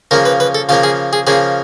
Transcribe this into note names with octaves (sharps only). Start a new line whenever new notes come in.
C#3 F3 A#3 A#4
B4
B4
A4
C#3 F3 A#3 F4
G#4
G#4
C#3 F3 A#3 G#4